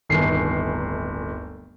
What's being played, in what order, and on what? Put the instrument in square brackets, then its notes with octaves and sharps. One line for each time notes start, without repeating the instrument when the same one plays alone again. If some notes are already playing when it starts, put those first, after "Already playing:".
[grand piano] D1 G1 D#3 C7